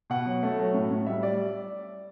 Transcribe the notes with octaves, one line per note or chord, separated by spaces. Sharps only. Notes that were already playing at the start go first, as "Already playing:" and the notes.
B2 F#5
F#3
A3
F#3
A2
A2
G3 E5
G3 D5